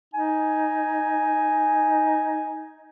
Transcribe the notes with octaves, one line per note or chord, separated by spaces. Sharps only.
D#4 G#5